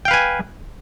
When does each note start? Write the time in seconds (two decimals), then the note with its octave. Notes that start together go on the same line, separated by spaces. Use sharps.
0.05 G5
0.08 F5
0.11 B4
0.14 G#5